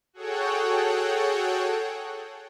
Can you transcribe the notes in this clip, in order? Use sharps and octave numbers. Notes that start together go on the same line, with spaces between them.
F#4 G#4 A4 C#5 F#5 G5